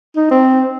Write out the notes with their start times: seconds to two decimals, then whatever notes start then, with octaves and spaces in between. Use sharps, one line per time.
0.16 D#4
0.31 C4